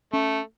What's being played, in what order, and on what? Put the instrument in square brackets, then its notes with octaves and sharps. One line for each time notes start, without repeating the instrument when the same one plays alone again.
[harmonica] A3 [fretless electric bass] C#4